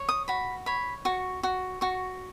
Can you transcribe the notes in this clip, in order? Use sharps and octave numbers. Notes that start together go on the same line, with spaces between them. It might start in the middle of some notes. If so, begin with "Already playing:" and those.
Already playing: C#5
D#6
F#4 B5
C#5 B5
F#4 C#6
F#4
F#4 C#6